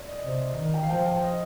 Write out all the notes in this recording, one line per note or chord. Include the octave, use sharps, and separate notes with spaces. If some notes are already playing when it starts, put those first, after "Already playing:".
Already playing: D5
D#5
C3
D#3
G5
F5
F3 G5
G5
D#5